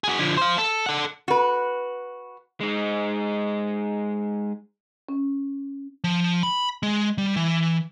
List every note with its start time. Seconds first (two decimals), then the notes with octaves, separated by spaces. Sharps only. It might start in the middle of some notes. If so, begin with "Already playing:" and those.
0.04 F#4 G#4
0.19 D3 F3
0.38 C5 F5
0.58 A4
0.86 A4 F#5
1.28 F#4 B4
2.61 G#3 D#4
5.09 C#4
6.04 F3
6.43 B5
6.83 G#3
7.18 G3
7.37 E3